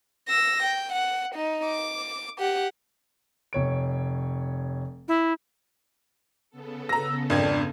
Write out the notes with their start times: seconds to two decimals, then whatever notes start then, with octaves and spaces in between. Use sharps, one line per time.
0.29 E6 A#6
0.62 G5
0.92 F#5
1.35 D#4
1.66 D6
2.38 G4 F#5
3.53 F1 C#5 D7
5.08 E4
6.50 C#3 B3 A4
6.89 A#5 E6 A#6
7.30 G#1 F2 D4 G#6